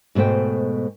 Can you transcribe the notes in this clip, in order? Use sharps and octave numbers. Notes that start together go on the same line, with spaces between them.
G#2 B2 A3 C5 G5